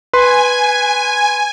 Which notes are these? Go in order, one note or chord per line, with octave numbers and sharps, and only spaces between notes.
B4 G#5 C6